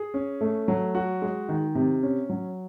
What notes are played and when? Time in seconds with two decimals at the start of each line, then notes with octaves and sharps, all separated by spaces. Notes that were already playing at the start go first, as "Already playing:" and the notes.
Already playing: G#4
0.14 C#4
0.41 A3
0.68 F#3
0.95 F#4
1.22 G#3
1.49 D#3
1.75 C3
2.03 C#4
2.30 F#3